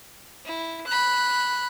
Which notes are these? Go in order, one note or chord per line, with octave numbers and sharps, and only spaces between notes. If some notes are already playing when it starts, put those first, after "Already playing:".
E4
B5 F#6